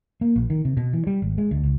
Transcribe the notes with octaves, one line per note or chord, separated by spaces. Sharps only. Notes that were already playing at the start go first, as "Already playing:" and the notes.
A#3
A#1
D#3
C3
B2
E3
G3
G#1
G#3
D2
C#2